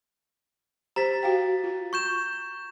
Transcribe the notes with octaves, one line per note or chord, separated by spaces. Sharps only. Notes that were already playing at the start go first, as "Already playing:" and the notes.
G4 C5 A#5 A6 B6
F#4 F5 G5
F4
C#6 G6 E7